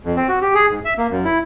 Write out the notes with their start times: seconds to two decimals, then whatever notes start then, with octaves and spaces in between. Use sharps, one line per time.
0.05 F2
0.16 C4
0.28 F#4
0.41 G4
0.55 G#4
0.70 G#2
0.85 E5
0.98 A#3
1.10 F#2
1.24 E4